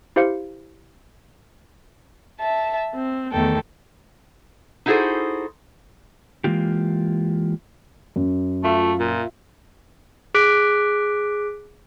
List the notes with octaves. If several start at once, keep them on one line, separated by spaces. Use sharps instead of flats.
E4 G4 C5 F5 C#7
E5 A5
C4
E2 D#3 A3 A4 G5
D#4 E4 F#4 G#4 A4 C5
E3 F3 G#3 A#3 F4 G4
F#2
A3 F4 E5
A#2
G#4 D6 F#6 B6 D7